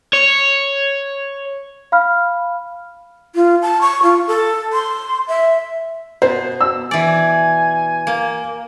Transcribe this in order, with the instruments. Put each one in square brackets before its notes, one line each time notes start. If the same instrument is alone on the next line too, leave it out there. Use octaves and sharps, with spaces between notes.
[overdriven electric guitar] C#5
[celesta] F5 B5 F6
[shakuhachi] F4
A5
C#6
F4
A4
C6
E5
[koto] B2 [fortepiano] C5
[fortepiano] E6
[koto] E3 D5 [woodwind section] G#5
[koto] A#3